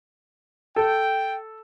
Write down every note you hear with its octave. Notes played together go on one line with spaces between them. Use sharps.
A4 G5